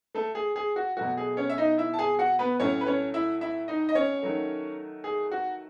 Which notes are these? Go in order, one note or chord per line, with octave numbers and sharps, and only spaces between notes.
A3 A4
G#4
G#4
F#4
B2 F#3 A3 F#4
G#4
C#4 C#5
E5
D#4 D#5
E4 E5
A5
G#4 G#5
F#4 F#5
B3 B4
A2 F#3 A3 C#4 C#5
B4
C#4 C#5
E4 E5
E4 E5
D#4 D#5
D#5
C#4 C#5
D#3 F#3 A3
G#4
F#4